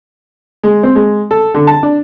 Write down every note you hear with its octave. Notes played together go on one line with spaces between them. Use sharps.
G#3
C4
G#3
A4
D3
A5
D4